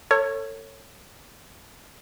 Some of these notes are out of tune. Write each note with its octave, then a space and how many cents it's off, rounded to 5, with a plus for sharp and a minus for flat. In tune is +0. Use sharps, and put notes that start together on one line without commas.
A4 +35 C#5 -10